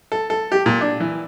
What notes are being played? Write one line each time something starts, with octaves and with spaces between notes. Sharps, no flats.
A4
A4
G4
A#2
D4
E3